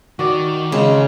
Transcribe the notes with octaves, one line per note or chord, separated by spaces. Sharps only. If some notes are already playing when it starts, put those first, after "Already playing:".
D#3 F#4 D5
C#3 G#3